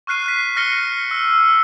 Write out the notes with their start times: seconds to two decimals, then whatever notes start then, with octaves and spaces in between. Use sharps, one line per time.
0.07 C#6 F6 F#6 C7 D#7
0.26 F#6 B6
0.57 F6 A#6 C#7 G7
1.11 E6